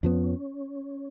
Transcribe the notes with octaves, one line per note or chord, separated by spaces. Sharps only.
F2 F3 B3 C#4